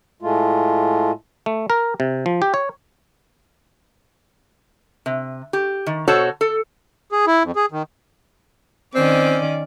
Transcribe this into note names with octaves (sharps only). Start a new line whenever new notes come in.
A2 G#3 A3 F4
A3
A#4
C3
F3
G4
C#5
C3
G4
D#3
B2 F#4 A4 C5 C#5 A5
A4
G#4
E4
F2
G#4
D#3
D#3 C4 C#4 D5